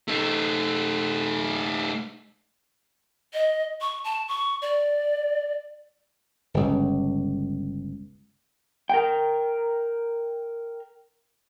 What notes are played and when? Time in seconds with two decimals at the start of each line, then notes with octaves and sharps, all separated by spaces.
0.08 A3 D#4
3.34 D#5
3.81 C#6
4.04 A5
4.28 C#6
4.62 D5
6.54 G1 C#2
8.90 A#4 G5